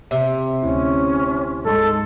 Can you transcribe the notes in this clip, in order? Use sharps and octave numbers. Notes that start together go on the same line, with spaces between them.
C3
D2 C#4 E4
G#2 G#3 A4 C6